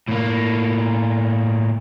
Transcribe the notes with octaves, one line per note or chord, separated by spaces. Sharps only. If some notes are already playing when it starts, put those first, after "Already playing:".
A2 A#3